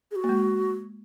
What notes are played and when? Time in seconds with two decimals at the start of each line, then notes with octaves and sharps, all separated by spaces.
0.11 G#4
0.16 F#4
0.24 A#3
0.29 G#3